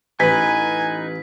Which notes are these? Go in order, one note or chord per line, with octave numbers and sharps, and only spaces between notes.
A1 D#4 B4 G#5 B6